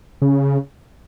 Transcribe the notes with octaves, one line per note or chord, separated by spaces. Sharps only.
C#3